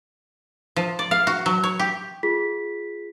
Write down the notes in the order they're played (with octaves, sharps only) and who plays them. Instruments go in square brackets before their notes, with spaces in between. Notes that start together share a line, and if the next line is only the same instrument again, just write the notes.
[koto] F3
D5
F5
F#4
F#3
C#5
G4
[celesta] F4 G#4 B6